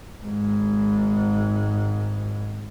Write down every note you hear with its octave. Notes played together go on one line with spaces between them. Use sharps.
G#1 G#2